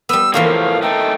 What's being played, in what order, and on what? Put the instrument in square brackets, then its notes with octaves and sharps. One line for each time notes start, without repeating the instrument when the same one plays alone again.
[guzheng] G3 B3 [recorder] E6
[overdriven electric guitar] A2 F3 [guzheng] E3 A#3 F#4 [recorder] F5
[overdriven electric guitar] A3 D#4 [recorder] G5